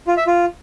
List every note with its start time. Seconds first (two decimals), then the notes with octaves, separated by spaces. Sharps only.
0.07 F4
0.17 E5
0.27 F4